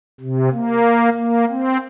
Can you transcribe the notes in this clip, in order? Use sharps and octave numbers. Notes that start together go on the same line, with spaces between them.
C3
A#3
A#3
C4